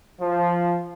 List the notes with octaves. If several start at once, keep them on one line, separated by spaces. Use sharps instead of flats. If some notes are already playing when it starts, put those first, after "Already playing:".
F3